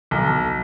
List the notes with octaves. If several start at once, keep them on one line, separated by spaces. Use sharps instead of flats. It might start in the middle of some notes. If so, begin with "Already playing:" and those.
B1